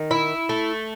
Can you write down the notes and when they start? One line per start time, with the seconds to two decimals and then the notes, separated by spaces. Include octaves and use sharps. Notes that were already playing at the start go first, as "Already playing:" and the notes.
Already playing: D#3
0.11 E4
0.49 A3